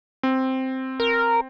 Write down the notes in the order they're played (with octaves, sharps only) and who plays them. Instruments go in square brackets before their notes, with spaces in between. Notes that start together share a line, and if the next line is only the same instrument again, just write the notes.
[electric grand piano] C4
[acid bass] A#4